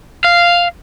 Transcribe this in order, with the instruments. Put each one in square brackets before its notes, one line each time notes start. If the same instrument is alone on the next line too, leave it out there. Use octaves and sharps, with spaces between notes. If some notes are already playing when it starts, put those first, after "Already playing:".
[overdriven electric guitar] F5